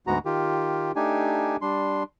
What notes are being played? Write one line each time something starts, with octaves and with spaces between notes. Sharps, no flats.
D2 G#2 G#3 B3 F#4 A#5
D#3 F4 G4
A3 D4 D#4 G4 G#5
G3 D4 C6